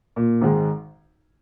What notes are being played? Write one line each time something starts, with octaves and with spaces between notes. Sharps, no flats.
A#2
G#1 G#2 D#3 G#3